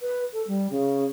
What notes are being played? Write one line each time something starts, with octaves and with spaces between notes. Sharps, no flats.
B4
A4
G3
C#3